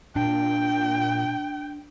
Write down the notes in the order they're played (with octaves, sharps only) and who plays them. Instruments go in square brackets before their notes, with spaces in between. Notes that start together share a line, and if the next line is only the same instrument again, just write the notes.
[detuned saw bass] A#2 [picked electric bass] D4 [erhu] G5